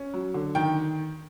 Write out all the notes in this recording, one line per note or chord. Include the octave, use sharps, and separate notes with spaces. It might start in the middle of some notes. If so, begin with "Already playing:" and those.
Already playing: C#4
F#3
D3
D#3 G5